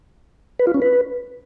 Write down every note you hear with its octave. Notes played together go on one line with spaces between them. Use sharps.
B4
F4
C#4
B4